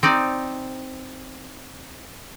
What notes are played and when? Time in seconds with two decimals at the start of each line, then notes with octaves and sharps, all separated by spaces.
0.03 C4 D#4 D5